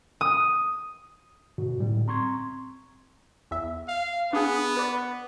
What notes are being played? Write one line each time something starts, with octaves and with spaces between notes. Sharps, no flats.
D#6
G#2 B2 D3 F#4
A2 G3
C4 A#5 C6 C#6 G#6
E2 E5
F5
B3 D4 G#4
B4 D5